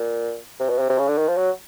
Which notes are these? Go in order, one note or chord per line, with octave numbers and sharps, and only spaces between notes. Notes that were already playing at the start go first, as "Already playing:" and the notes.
Already playing: A#2
C3
B2
C3
C3
C#3
D3
D#3
F3
F#3